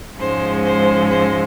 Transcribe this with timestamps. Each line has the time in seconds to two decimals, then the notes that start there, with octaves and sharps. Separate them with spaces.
0.18 G#2 F3 G#3 C#4 C5
0.64 C5
1.08 C5